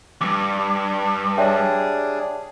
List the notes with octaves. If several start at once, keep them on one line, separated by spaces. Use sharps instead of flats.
E2 G2 D6
G3 D4 G#4 C#5 E5 G5